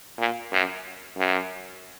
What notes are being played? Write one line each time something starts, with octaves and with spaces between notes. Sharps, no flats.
A#2
F#2
F#2